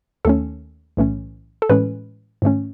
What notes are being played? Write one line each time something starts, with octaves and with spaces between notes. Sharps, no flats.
D#2 D#3 A3 C#4 A4
B1 A2 E3 A3 C#4
A4
A2 E3 G#3 C#4 B4
G#2 D#3 A3 C#4